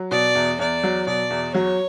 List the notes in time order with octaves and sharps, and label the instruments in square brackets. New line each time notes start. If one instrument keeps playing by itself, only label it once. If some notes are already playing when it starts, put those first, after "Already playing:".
Already playing: [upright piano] F#3
[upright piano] B2 [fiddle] D5
[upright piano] E2
[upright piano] E2 [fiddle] D5
[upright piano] F#3
[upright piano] B2 [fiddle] D5
[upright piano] E2
[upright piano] F#3 [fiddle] C#5